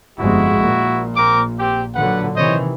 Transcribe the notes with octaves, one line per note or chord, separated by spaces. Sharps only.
G1 F2 G#3 E4 F#4
A#1 A#2
C4 A#4 D6
C4 G4
A#2 D3 F#3 B4 F#5
C3 D#3 E3 C5 C#5 D#5